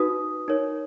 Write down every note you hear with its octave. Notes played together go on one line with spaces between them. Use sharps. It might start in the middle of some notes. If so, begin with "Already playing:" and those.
Already playing: D#4 F#4 B4 D#6
D#4 A#4 C#5